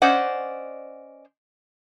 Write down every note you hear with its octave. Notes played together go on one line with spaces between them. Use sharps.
C#4 C5 D5 D#5 F#5